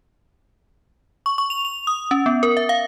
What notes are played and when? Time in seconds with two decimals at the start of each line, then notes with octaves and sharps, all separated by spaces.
1.26 C#6
1.38 C#6
1.50 F7
1.65 F7
1.87 D#6
2.11 C#4
2.26 B3
2.43 A#4
2.57 E5
2.69 F5